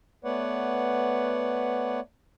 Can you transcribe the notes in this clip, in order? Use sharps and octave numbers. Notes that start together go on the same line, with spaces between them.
A3 B3 B4 C#5 D5 F#5